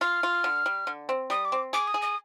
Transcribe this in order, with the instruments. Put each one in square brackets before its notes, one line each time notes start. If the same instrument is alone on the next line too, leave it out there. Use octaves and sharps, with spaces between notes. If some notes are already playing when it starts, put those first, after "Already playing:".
[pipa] F4 [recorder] F6
[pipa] F4
D3
G3
D3
C4
[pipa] G3 [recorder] D#6
[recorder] D6
[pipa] C4
[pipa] G#4 [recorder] D6
[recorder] D#6
[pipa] G#4
[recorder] D#6